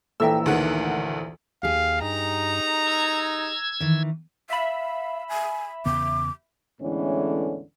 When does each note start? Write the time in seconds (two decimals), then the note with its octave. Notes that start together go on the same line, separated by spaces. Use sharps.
0.20 A#1 E3 A4 E5 G5 A#5 E6
0.46 D2 D#3 G#4 B4 C#5 F#5
1.63 D#2 G4 G#4 F5
2.01 G2 D#4 A#5
2.87 E6 G#6
3.80 D#3 E3
4.50 E5 F5 B5
5.29 G#5
5.86 E2 C#3 B3 D6
6.81 E2 A2 D3 E3 G#3 C#4